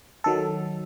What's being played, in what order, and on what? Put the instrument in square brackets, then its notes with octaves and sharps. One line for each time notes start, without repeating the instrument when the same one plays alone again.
[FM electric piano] D#3 F#3 A4